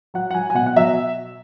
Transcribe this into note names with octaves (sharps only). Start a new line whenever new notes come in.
F#3 F#5
F#5
F#3 G#5
G#5
B2 F#5
F#5
F#3 E5